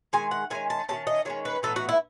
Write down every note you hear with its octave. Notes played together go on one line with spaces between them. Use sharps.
D#3 G#3 G#5
F#5
D#3 G#3 C#4 G#5
A5
D#3 G#3 C#4 A5
D#5
D#3 G#3 C#4 C#5
B4
A2 E3 B3 D#4 A4
F#4
E4